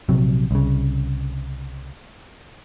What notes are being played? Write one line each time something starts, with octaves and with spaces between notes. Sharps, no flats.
A#1 C3 F#3
C2 C#3